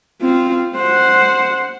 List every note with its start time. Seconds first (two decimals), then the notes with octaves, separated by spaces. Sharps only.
0.21 C4 F4
0.76 C5 F#5